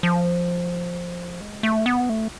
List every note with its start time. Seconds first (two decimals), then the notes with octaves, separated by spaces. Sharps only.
0.03 F3
1.41 G#3
1.63 A3
1.86 B3
2.09 A3